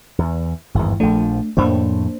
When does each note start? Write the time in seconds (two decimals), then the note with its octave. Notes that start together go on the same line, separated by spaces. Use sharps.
0.19 E2
0.75 G#1 E2 G2 E4
1.00 A#1 F3 A3 D4
1.57 F2 A2 A3 A#3 D4 C5